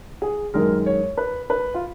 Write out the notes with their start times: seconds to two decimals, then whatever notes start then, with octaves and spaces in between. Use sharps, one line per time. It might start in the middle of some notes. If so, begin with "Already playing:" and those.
0.22 G#4
0.54 F#2 D#3 G#3 A#4
0.86 C#5
1.17 B4
1.50 B4
1.75 F4